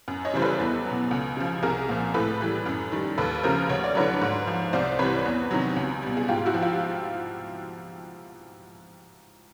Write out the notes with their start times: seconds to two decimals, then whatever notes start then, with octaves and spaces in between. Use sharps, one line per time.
0.08 F#2
0.25 C#5 D#5
0.34 C#3 E3 G3 C5
0.42 A4 B4
0.60 E2
0.85 B2 F#3
1.11 C#2
1.37 C#3 F3
1.62 C2 G#4 A#4
1.89 A#2 F3
2.14 A2 A4 B4
2.40 E3 G3
2.66 F#2
2.92 D#3 G3
3.18 D#2 A4 B4
3.43 C#3 F3 A#4 C5
3.69 D2 C#5
3.84 D5
3.95 D3 F#3 B4 C#5
4.21 G#2
4.47 F3
4.73 C2 C5 D5
4.99 C3 E3 G3 B4 C#5
5.25 E2
5.51 C3 D#3 F#3
5.76 C#2
6.02 B2 G3
6.17 G#4
6.28 G#2 F4 G4
6.45 E4 F#4
6.54 F3
6.62 F4 G4